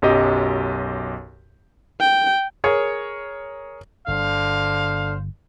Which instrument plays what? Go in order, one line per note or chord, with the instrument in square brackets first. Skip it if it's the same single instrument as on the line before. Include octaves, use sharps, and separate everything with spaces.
[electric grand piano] B1 F#2 G4 D#5
[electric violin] G5
[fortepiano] G#4 A#4 C#5
[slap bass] G1 [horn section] D3 C5 F5